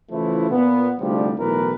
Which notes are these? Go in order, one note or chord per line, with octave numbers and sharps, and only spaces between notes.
C#3 E3 F3 A3 E4
A#2 B3
D2 G#2 C3 F3 G3
B1 A2 E3 A#4 B4